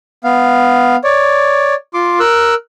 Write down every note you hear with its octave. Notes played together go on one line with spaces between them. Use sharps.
B3 F5
C#5 D5
F4 C6 D6
A#4 E6 F#6